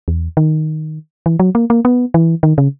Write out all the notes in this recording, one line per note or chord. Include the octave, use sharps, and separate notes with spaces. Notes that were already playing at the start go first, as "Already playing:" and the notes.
E2
D#3
E3
F#3
A#3
A#3
B3
E3
D#3
C#3